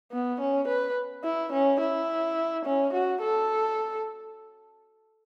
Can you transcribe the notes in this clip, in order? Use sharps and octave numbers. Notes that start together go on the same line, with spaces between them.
B3
C#4
B4
E4
C#4
E4
C#4
F#4
A4